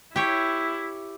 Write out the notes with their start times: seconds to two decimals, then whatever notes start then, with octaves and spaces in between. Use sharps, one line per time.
0.16 E4 G4 C#5